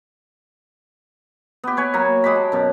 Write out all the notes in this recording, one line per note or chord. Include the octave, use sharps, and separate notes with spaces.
B3 G4
B4 C#5 G#5
F#3 A#3
G#3 G4 F#5 B5
A5
F#2 B2